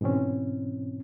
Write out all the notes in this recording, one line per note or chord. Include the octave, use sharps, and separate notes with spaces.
G#2 B2 E3 C4 C#4